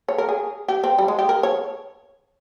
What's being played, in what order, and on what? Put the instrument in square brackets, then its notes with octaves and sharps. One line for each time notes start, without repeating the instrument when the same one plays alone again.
[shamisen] C#5
A#4
G#4
G4
C4
G3
G#3
G4
A#4
C#5